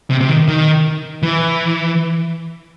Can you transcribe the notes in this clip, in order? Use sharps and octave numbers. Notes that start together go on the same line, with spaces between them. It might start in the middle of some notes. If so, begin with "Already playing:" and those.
C3
C3
D#3
D#3
E3